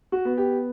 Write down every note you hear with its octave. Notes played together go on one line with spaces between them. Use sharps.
F#4
B3
G4